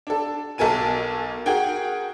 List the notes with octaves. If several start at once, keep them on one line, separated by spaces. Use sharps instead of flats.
D4 A4
B1 A4 A#4 G#5 D#7
F#4 G#4 A#4 G5